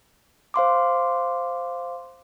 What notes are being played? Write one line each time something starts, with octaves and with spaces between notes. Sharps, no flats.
C5 F5 C6 D6